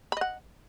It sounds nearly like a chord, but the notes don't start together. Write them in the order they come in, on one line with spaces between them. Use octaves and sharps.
B5 D#5 F#5